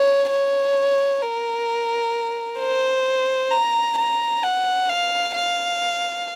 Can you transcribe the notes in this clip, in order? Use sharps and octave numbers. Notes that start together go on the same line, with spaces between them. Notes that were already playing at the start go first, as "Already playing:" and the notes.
Already playing: C#5
C#5
A#4
C5
A#5
A#5
F#5
F5
F5